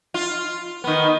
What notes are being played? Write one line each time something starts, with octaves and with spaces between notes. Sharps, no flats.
F4
D#3 B3